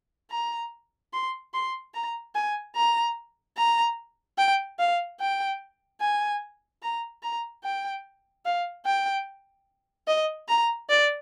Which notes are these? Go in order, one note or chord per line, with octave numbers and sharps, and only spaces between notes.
A#5
C6
C6
A#5
G#5
A#5
A#5
G5
F5
G5
G#5
A#5
A#5
G5
F5
G5
D#5
A#5
D5